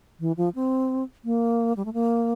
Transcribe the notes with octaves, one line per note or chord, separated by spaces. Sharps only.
E3
F3
C4
A#3
G3
A3
A#3